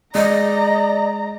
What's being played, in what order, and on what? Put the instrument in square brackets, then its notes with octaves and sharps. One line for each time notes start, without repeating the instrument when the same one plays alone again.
[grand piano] G#3 [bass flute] D5 [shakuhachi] D#5 [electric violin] A#5